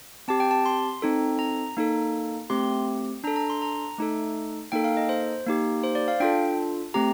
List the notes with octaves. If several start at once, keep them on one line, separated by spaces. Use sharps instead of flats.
C4 G4 A5
G5
A5
C6
C4 D#4 A4
A#5
A#3 D#4 A4
A3 C4 G4 C6
D4 A4 A#5
A#5
C6
A#5
A3 D#4 A4
A#3 D#4 A4 G5
F5
D#5
C5
A#3 D#4 G4
C5
D5
F5
D4 F4 A4 G5
A3 C4 G4 A#5